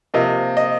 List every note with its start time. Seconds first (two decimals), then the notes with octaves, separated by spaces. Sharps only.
0.14 C3 F3 A#3 D#5
0.57 D#5